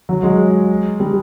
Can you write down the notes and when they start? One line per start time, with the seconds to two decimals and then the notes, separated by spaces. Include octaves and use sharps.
0.09 F#3
0.23 G#3
1.00 G3